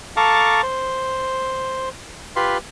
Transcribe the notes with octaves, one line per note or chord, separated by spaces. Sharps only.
A4 F5 A5 A#5 C#6 D6
C5
F4 G4 B4 C6